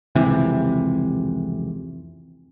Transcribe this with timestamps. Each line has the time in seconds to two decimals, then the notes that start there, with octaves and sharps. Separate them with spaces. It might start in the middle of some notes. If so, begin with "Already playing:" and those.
0.15 F1 C#2 C3 E3